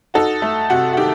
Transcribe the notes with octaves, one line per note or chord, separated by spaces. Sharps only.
D#4 F#4 A4
A3
C3 F#4
F#4
D#3 G4